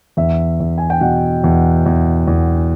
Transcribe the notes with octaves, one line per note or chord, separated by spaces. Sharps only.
E2 E5
E2
G#5
G5
B2 F#5
E2
E2
E2